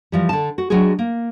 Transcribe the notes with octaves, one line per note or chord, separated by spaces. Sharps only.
E3 F3 G3
D3 A5
F#4
F#3 G#3 D4 F#4 G#4
A#3